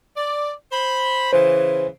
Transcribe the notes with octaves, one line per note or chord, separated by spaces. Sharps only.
D5
C5 B5
C#3 E3 C5